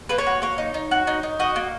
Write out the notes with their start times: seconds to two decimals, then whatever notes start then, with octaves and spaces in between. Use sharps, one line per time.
0.09 A#3 B4
0.18 C#5
0.27 F#4
0.42 A#3 C#5
0.58 D#4
0.74 D#4
0.91 F#4
1.07 D#4
1.23 D#4
1.40 F#4 D#5
1.56 A#3